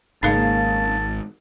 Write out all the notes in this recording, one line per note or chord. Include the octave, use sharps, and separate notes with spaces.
G#1 G#2 C#3 A#3 D#4 A#4 F5 A5